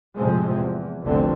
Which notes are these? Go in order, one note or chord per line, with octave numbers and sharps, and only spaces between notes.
F2 A2 C3 F3 G#3 C4
E2
F1 C2 F2 B2 D3 C4